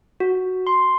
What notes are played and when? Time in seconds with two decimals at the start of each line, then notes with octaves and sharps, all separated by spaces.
0.20 F#4
0.67 C6